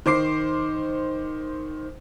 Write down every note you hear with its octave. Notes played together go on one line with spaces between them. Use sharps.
D#3 C5 D6 C7